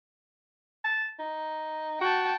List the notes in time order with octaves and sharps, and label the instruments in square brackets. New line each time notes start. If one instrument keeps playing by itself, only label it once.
[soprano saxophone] A5
D#4
[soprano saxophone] F#4 [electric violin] G5 A5